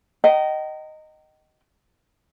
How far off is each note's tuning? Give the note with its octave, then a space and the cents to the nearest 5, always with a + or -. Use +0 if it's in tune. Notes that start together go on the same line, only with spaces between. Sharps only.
D#5 -5 G5 -35 A#5 -25